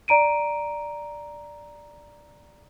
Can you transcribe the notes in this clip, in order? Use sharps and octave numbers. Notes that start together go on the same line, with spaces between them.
D5 A#5 D7 D#7